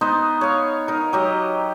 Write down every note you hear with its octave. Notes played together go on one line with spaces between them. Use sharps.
B3 D#4 C5
C#5 F5
D#4 A#4
F#3 G4 D#5